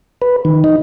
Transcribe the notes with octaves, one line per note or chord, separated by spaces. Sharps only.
B4
D#3
D#4